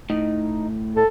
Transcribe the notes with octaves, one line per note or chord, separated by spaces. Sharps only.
A2 D#4
A2 A4